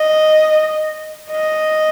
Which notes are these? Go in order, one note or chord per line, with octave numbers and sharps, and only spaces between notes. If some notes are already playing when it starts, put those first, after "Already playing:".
Already playing: D#5
D#5